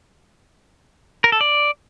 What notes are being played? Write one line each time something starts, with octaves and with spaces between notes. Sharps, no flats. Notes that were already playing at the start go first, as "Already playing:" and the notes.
A#4
A4
D5